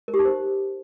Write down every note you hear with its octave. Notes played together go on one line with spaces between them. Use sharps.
A#4
G4
D#4
C5